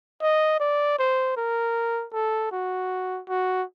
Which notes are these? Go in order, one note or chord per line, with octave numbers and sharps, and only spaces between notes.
D#5
D5
C5
A#4
A4
F#4
F#4